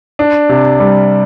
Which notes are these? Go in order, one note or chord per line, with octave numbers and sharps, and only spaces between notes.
D4
C3
G3